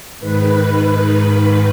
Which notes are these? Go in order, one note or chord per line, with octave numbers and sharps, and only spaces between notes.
G#2 D#3 B4
B4